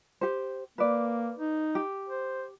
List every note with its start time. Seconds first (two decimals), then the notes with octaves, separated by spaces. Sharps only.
0.21 G4 C5
0.78 A#3 B4 D5
1.38 D#4
1.75 G4
2.09 C5